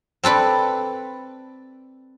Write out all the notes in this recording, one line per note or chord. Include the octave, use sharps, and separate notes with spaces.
C4 A4 B4 D5